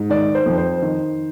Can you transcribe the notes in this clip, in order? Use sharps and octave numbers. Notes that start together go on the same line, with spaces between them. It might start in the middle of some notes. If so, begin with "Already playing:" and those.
Already playing: G#2
D#3 D5
C5
F2
C5
D#3